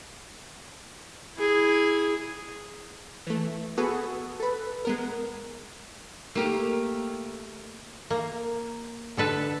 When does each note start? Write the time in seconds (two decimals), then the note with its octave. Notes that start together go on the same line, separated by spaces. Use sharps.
1.37 E4 G#4
3.27 E3 A3
3.77 B3 F#4 G#4 A4 B4
4.40 A4 B4
4.85 G#3 B3 A#4
6.35 A3 A#3 G4 A#4
8.10 A#3
9.17 D3 A4 B4 A5